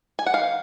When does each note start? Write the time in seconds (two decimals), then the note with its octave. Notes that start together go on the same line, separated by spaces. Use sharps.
0.19 G#5
0.26 F#5
0.34 D#3 F5